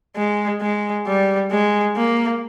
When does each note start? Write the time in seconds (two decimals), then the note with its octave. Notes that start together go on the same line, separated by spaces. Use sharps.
0.16 G#3
0.61 G#3
1.07 G3
1.51 G#3
1.96 A#3